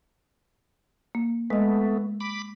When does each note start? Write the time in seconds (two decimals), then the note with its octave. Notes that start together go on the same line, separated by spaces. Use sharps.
1.15 A#3
1.50 G#3 A3 B3 D#5
2.20 B5 D6